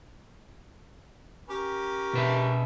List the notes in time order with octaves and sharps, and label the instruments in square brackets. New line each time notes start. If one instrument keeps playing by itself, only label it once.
[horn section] C#4 G4 A#4
[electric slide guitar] B2 B4 E5